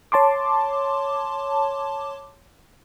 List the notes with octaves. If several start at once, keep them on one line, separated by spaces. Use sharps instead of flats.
C#5 A5 C6 D6